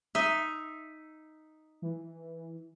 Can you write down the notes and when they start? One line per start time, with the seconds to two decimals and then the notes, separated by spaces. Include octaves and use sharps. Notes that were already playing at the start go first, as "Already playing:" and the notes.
0.15 D#4 E5
1.82 E3